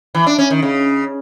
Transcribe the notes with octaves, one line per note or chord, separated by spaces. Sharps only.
E3
D4
C#4
D#3
C#3